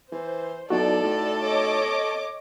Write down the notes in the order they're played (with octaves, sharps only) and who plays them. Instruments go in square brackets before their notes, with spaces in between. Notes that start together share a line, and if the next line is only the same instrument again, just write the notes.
[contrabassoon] E3 [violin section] C5
[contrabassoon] B1 [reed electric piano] D#4 E4 F#4 [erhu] A4 [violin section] D5
[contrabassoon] A2
[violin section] C#5 D#5 D6